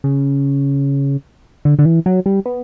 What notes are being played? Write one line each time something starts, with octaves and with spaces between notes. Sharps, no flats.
C#3
D3
D3
E3
F#3
G3
B3